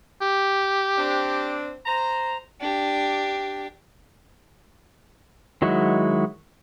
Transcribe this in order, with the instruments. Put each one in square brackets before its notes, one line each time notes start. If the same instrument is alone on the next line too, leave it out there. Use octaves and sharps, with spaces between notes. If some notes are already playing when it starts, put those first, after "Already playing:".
[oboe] G4
[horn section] C4 D4
C5 A#5
[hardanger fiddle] D4 G4
[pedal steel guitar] D#3 F#3 G#3 E4 F#4